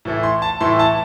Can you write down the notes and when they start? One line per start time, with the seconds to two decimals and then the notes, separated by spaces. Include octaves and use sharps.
0.05 A2 E3 A3
0.23 C6
0.42 A5
0.61 A2 E3 A3 C6
0.79 A5